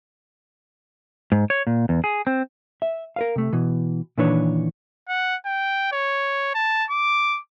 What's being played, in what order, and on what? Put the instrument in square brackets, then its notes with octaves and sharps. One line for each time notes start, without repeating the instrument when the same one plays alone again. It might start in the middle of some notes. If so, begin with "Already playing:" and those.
[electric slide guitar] G#2
C#5
A#2
E2
G#4
C4
[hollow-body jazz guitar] E5
A#4 B4 F5
C3 A3
B2 E3
A#2 D#3 E3 D4 B4 C#5
[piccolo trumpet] F#5
G5
C#5
A5
D6